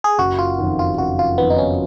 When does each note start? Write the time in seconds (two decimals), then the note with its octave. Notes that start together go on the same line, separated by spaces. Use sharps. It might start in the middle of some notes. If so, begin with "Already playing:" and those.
0.04 G#4
0.18 F#1 F#4
0.39 F4
0.58 F2 D#3
0.79 F4
0.98 F#1 F#4
1.19 F4
1.38 F2 D#3 B3
1.50 D#4
1.58 C#4